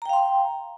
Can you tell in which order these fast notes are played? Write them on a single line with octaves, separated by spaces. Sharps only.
A#5 G5 F5 C6